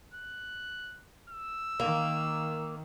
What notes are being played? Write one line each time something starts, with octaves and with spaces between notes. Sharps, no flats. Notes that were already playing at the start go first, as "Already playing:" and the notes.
F#6
E6
D#3 A#3